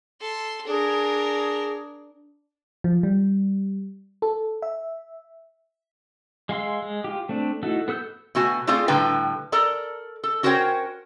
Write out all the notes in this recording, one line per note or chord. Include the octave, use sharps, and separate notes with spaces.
A4 C6
D4 G#4 A#4
F3
G3
A4
E5
G#3 F5 C6 E6
G#3
F4 G4
A3 C4 D4
A3 D#4 E4 F#4 A4
B3 A4 E6 F#6 G6
B2 A3 F#4 G#5
A3 C4 F4 G#4 D5 F5
A2 D3 G3 B4 G5 A#5
A4 A#4 D5 A#5
A4
C#4 F#4 A#4 C5 C#5 G5